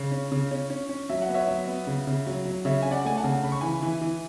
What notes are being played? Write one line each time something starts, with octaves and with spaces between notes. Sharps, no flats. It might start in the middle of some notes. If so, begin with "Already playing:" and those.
Already playing: C#3
C#4
C#3
C#4
C#4
C#4
F#3 E5
F#5
B3
C#5 E5
F#3
B3
C#3
C#3
F#3
F#3
C#3 C#5 E5
C#4 G#5
D5 F#5
A3 G#5
F#5 A5
C#3
C#3 B5
C#6
E3 G#5 B5
E3
E3